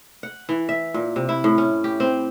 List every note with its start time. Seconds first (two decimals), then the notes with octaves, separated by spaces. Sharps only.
0.23 F#5
0.49 E3
0.69 E5
0.94 A#2
1.16 C3
1.29 E4
1.44 A2
1.58 C#4
1.84 G4
2.00 C4